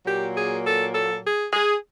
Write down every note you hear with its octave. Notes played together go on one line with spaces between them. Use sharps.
A#2 F#3 A#3 G4
G#4
A4
A4
G#4
G#4